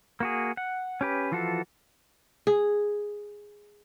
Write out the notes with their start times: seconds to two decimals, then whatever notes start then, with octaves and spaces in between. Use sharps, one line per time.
0.20 A#3 F#4 G#4
0.57 F#5
1.01 C#4 G4 B4
1.32 E3 F3 F4 F#4 A4
2.47 G#4